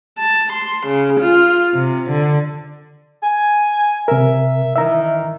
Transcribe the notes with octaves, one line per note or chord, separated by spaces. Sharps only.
A5
C6
C#3
F4
C3
D3
G#5
C3 A#4 E5
D#3 E3 E5 A#5